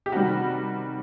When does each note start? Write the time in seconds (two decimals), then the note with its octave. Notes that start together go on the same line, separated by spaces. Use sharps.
0.06 G4
0.12 C3 D#3 G3 F#4